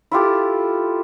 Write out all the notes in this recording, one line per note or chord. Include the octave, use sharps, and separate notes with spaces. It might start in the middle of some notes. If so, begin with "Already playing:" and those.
E4 F4 G4 A4